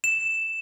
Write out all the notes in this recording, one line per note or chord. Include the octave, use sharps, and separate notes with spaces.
E7